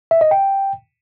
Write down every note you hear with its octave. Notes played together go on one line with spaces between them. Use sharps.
E5
D#5
G5